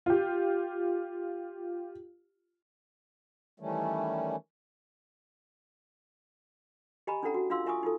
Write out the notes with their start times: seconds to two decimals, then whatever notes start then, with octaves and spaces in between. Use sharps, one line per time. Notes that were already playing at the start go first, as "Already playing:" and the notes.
0.06 F4 G4
3.60 D#3 E3 G3 A3 C#4
7.07 G4 D#5 G#5 A#5 B5
7.23 C#4 D4 E4 A4 F#5 A#5
7.34 F#4
7.50 D4 F4 F5 C6 E6
7.66 F4 E5 G#5 C#6 D#6
7.83 D#4 F4 A4